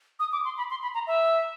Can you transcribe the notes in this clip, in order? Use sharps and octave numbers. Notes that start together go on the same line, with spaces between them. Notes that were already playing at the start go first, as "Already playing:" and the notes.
D#6
D6
C6
B5
C6
B5
A#5
E5